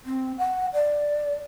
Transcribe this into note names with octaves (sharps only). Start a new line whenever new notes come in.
C4
F#5
D5